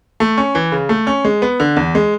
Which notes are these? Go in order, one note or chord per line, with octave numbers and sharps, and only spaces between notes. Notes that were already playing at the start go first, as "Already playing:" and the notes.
A3
C#4
E3
C#3
A3
C#4
G#3
B3
D3
E2
G#3